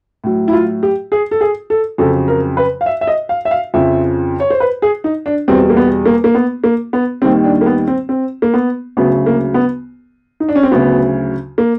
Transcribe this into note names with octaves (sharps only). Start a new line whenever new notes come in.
A2 F#3
E4
F4
G4
G#4
A4
G#4
A4
F2 C#3 F#3 A4
A#4
B4
F5
E5
E5
D#5
F5
E5
F5
F2 C#3 F3 E5
C#5
C5
B4
G#4
D#4
D4
E2 B2 G3 C4
A#3
B3
A#3
A#3
B3
A#3
B3
D#2 D#3 G3 C4
D4
A#3
B3
C4
C4
A#3
B3
D2 C#3 F#3 B3
A#3
B3
D#4
D4
C#4
C4
D2 C#3 F#3 B3
A#3